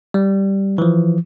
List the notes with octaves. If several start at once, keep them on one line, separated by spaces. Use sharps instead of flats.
G3
E3 F3